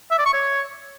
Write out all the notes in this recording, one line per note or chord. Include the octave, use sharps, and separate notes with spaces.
E5
D5
C#6
C#5